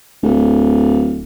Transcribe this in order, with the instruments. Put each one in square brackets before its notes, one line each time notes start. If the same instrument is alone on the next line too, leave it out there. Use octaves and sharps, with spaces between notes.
[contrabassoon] D1